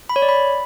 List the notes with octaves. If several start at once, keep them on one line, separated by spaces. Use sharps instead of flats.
B5
C#5
D5
B5